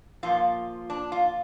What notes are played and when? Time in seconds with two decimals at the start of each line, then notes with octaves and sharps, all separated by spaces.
0.23 A#2 F3 A#3 F4
0.90 D4
1.12 F4